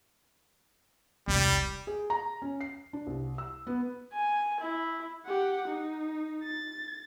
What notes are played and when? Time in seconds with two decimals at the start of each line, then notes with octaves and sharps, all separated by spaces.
1.28 E1 C2 G3
1.87 G#4
2.10 A#5
2.42 C#4
2.61 C7
2.93 D4
3.07 C2
3.38 E6
3.67 B3
4.13 G#5
4.60 E4
5.26 G4 F#5
5.68 D#4
6.43 A6